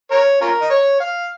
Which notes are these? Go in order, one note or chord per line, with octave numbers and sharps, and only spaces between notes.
A#4 C#5
C#4 F4 A#4
D#5
C#5
F5